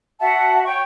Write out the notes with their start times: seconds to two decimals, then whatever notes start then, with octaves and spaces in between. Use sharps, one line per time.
0.20 F#4 E5 F#5 A5
0.65 C#5 G5 C#6